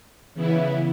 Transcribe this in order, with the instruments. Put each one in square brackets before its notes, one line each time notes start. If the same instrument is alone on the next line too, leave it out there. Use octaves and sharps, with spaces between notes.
[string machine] C#3 E3 B3 E4